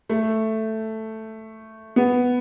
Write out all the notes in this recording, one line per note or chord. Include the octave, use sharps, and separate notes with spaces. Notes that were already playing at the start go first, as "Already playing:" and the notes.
A3
B3